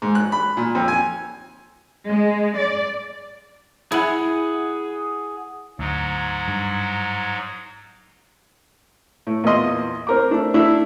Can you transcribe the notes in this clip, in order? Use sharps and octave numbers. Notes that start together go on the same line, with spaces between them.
G#2
F#6
B5
A#2
F2
G#5
G#3
D5
E4 G#4 F#5
D2 G#2 F#3
G2
A2
E2 A#2 E3 D#5 C6
C4 A#4 D6
A3 D4
A3 D4 E4